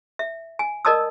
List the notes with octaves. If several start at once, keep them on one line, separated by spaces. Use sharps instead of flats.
E5
G#5
A#4 D5 D#5 A5 D#6 E6